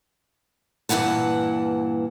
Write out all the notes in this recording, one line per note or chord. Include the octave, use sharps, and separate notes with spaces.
G2 A#2 E3 F#5 A5